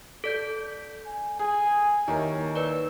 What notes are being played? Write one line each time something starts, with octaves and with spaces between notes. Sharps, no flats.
A4 D5 G6
G#5
G#4 G#5
D#2 D#4 E4 A#4 C#5
B4 D5